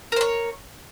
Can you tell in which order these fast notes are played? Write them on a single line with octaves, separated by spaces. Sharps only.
A#4 C5 C#5